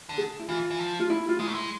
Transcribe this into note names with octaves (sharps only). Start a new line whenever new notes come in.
D3
G#4
E4
E3 F4
E3
F3
F4
E4
F4
G#3 E4
A3
G#3